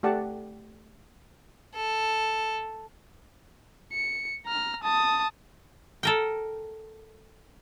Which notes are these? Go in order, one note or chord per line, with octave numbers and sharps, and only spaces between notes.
A3 G4 D5 F#5 A5
A4
C#7
A#5 F6
A5 D#6
A4 A#4 G5